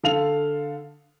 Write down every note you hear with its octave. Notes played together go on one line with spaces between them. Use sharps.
D3 A4 F5 F7